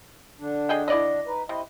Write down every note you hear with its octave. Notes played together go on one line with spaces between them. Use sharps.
D3 D4
G#4 D#5 G5
E4 D5 D#5
D#4 B4
C3 E4 D#5